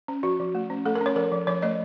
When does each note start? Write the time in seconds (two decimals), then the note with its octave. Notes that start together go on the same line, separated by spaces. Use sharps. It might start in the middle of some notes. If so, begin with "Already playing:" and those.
0.08 C#4
0.23 F3 F#4
0.40 F3
0.55 A3
0.70 C#4
0.85 A3 A4
0.95 A#4
1.01 C#4 C#5
1.16 F3 A#4
1.32 F3
1.47 F3 C#5
1.62 A3 D#5